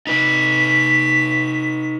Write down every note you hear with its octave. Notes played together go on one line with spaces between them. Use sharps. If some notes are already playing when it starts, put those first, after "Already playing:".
D#4 B4 B6